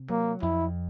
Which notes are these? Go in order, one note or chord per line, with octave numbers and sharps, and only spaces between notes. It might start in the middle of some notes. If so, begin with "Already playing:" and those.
Already playing: C3
F#3 A#3
F2 E4